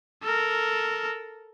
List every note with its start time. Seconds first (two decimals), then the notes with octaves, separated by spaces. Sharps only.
0.23 A4 A#4